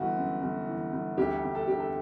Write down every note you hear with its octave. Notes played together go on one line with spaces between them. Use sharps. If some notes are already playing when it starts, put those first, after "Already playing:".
Already playing: G1 E3 F#4
F#2
G1
E3
G1
D2 G4
D2
A4
D3 G4
A4